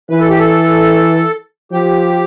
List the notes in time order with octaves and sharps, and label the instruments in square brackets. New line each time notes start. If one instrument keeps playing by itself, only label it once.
[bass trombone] E3 [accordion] B4
[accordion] A4
G4
A4
[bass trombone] F3 [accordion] G4